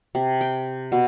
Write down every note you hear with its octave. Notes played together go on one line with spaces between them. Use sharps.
C3
G5
B2